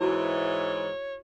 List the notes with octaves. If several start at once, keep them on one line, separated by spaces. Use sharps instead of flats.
G#2 E3 E4 F#4 C#5